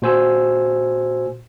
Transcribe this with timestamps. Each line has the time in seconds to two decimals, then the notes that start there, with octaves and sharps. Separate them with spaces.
0.02 A#2 F#4 C5 G#5 E6